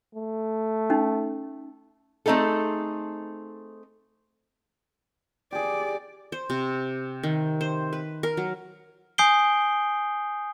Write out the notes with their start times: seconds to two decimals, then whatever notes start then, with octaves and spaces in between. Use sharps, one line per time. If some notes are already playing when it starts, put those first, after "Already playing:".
0.15 A3
0.90 C#4 D#4
2.26 A3 C4 D#4 G#4 A4
5.52 G4 G#4 D5
6.32 C5
6.50 C3
7.23 D#3
7.61 C5
7.93 B4
8.23 A#4
8.37 F#3
9.18 G#5 D#6 G6 C7 D7 G7